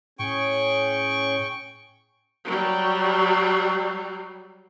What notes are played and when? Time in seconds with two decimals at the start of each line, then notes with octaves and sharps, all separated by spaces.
0.19 A2 C#4 G#4 G5 G#5 C#6
2.45 F#3 G3